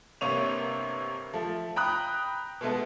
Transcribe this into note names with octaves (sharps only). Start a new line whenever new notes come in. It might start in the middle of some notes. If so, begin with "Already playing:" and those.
G1 C3 A#3 C#5 D#7 F7
F3 A3
G5 A#5 B5 D#6 F#6
B2 G#3 A3 B3